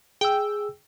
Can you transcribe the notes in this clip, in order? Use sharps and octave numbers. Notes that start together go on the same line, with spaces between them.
G#4 G5 E6